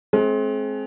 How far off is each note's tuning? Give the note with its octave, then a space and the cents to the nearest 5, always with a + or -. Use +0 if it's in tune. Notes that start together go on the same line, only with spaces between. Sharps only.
G#3 +35 C4 +20